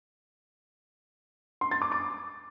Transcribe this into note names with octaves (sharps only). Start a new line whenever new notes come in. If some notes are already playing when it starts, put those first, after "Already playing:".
C6
A6
D6
D6